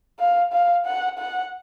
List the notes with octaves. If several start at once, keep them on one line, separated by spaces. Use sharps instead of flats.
F5
F5
F#5
F#5